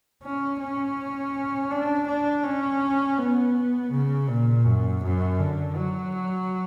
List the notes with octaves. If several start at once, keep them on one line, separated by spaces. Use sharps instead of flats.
C#4
C#4
D4
D4
C#4
B3
C#3
A#2
F#2
F#2
D3
F#3